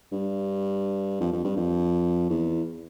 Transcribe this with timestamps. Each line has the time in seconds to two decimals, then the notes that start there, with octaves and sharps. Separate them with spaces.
0.12 G2
1.20 F2
1.33 F2
1.45 G2
1.57 F2
2.30 E2